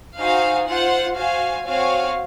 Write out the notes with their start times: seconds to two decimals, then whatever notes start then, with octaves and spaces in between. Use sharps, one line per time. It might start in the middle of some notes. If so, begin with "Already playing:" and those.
0.17 D#4 F#4 C5 F5 G#5
0.67 F4 C5 F#5
1.16 F#4 C5 F5 G#5
1.65 C4 F#4 C#5 F5 G#5